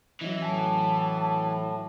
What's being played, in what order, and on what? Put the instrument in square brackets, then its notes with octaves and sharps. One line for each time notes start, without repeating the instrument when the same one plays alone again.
[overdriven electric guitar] E3 [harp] F#3 C#4 E4 [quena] D#5
[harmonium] A2 [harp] G#5 [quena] A5